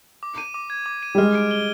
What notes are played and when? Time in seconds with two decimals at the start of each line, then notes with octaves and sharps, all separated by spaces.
0.23 D6
0.38 D#7
0.54 D6
0.70 G#6
0.86 D6
1.03 D#7
1.15 G3
1.18 G#3 F6
1.35 D7
1.51 G7